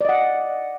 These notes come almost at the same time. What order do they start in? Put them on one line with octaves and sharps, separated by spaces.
D5 D#5 F#5